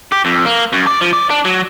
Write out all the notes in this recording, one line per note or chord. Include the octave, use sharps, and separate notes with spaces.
G4
F2
A#3
F#2
D5
F3
D5
D4
F#3